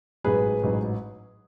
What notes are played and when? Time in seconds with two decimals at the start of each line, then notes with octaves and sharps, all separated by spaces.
0.24 A1 G#2 F#3 G#4 B4
0.62 A1 G#2 F#3